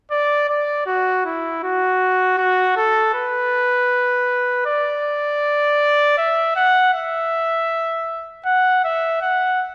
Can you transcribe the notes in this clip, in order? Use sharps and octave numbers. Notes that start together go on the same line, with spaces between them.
D5
D5
F#4
E4
F#4
F#4
A4
B4
D5
E5
F#5
E5
F#5
E5
F#5